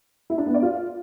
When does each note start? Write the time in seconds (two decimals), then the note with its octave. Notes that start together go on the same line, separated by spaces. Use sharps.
0.30 E4
0.38 D4
0.46 B3
0.54 D5
0.63 F4